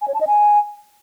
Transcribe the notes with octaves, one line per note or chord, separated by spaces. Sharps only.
G#5
C#5
A5
D#5
G#5